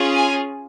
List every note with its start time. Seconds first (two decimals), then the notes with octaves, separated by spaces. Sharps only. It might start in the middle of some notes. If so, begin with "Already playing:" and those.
Already playing: C#4 F4 G#4
0.17 G#5